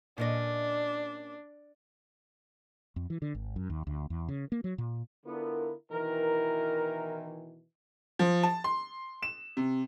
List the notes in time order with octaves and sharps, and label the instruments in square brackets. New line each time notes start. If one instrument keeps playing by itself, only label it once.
[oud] A#2 C#4 D#5 [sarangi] D4
[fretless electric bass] F2
E3
D3
G#1
F#2
D#2
D2
E2
C#3
A#3
F#3
A#2
[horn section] D3 B3 [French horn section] E4 F4 A#4
[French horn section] B2 D#3 E3 [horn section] A#4
[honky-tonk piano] F3
A5
C6
E7
C3